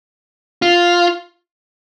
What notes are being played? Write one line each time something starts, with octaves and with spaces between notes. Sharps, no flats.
F4